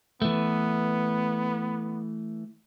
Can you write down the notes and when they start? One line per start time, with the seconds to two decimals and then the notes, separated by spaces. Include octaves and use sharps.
0.22 E3 A3 B3